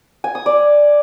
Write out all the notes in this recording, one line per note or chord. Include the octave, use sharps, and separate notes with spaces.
G#5
D#6
D5